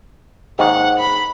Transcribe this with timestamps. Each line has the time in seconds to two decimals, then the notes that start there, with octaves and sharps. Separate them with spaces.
0.59 D#2 G#2 D#3 F#5
0.99 B5